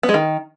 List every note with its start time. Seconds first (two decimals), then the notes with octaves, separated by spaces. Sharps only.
0.03 B3
0.09 G#3
0.14 D#3